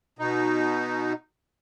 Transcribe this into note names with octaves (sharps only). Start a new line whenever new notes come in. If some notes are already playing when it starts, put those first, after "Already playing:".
B2 D#4